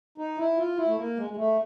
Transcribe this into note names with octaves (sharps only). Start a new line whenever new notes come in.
D#4
E4
F4
E4
A3
A#3
G#3
G#3
A3